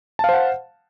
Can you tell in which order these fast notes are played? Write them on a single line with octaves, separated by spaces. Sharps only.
A5 F5 C5 F#5